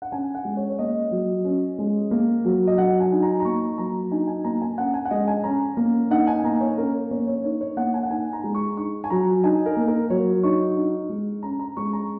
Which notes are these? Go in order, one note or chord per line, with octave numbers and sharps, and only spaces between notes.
F#5
C#4 G#5
F#5
G#3
C#5
C#5
A#3 D#5
F#3
C#4
G#3
A#3
F#3
D#5
F#3 F#5
G#5
D#4
A#5
A#5
A#3 C#6
F#3 A#5
D#4 G#5
G#5
A#3 A#5
G#5
C#4 F#5
G#5
F#5
G#3 D#5
G#5
C#4 A#5
A#3
D#4 F#5
G#5
A#3 A#5
C#5
C#4 A#4
A#3 C#5
C#5
D#4 C#5
C#5
A#3 F#5
G#5
F#5
D#4 G#5
A#5
G#3
C#6
D#4 C#6
G#5
F#3 A#5
D#4 G#5
A#4
A#3
A#4
F#3 C#5
D#4 C#6
D#4
G#3
C#4 A#5
A#5
G#3 C#6
A#5